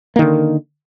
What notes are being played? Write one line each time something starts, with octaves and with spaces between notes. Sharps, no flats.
D3 D#3 A#3